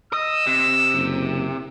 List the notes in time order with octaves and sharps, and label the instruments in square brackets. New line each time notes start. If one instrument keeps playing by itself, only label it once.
[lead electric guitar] D#5 [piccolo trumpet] E6
[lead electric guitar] C3
[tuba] F#1